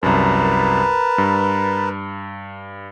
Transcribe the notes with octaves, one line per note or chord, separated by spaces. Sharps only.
C2 F#2 A#4 B4 A5
G2